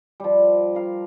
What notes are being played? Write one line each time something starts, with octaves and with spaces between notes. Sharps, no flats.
F3 G3
A#4 F5